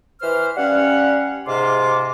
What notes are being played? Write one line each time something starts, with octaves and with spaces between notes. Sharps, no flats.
E3 C5 F6
G3 C#4 F5 F#5
G#2 C3 F4 C6 D6